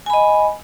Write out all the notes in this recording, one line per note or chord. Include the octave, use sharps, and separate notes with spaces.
D#5 G#5 B5